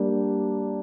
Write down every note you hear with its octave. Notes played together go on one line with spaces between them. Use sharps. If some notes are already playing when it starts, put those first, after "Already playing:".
Already playing: G3 A#3 D4 G4 D5